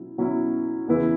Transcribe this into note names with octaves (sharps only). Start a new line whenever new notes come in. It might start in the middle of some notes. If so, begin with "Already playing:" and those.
Already playing: B2 F#3 C#4 E4
B2 F#3 C#4 E4
E2 C#3 E3 B3 E4